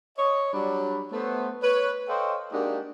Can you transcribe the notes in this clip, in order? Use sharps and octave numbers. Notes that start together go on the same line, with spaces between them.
C#5 D#5
F#3 G3 D4 B5
A3 B3 C5
B4 C#5
A4 C5 C#5 D#5 F5 G5
G#3 A#3 D4 D#4 F#4 G4